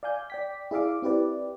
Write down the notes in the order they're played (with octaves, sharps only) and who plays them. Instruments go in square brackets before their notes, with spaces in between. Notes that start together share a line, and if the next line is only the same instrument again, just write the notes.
[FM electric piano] D5 F5 G#5 G6
D5 G5 B6
E4 G#4 D5 E5 F5 D6
C4 E4 G4 B4 D5